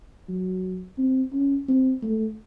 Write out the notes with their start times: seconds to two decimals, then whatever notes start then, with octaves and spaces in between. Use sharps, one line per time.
0.28 F#3
0.98 C4
1.33 C#4
1.68 C4
2.03 A3